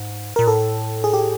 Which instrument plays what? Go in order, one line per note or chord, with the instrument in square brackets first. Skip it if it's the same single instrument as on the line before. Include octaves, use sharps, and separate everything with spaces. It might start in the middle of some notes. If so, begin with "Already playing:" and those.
Already playing: [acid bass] G#2
[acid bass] A#2 [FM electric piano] A#4
[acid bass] A2 [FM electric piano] A4
[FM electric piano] G#4
G4